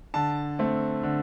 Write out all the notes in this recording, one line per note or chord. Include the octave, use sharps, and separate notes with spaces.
D3 A5
A3 C4
D3